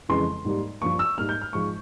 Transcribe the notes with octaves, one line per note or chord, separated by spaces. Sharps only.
F2 C#3 E3 G#3 C6
G#2 G3 A#3
G2 F3 A#3 C#6
E6
G#2 G3 A#3 F6
G6
F6
G#2 F3 G#3 C#6